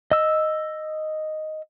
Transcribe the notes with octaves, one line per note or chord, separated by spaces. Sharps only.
D#5 E6